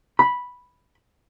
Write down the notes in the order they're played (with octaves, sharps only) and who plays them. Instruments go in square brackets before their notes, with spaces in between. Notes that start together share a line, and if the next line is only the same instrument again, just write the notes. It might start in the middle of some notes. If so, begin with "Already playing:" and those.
[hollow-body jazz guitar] B5